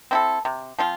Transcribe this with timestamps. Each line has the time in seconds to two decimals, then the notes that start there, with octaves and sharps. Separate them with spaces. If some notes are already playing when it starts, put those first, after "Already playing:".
0.11 C4 E4 A4
0.45 C3
0.79 F3 C4 F4